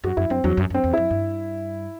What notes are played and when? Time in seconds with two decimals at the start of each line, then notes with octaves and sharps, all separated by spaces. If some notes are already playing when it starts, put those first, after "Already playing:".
0.04 F#2 F#4
0.17 F#2 E4
0.30 F#2 C4
0.44 E2 F#3
0.57 F#2
0.70 F#2 C4
0.84 E2
0.93 F#2 E4
1.11 G2